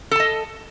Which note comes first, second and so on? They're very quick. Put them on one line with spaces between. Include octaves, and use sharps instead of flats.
A4 A5 D#5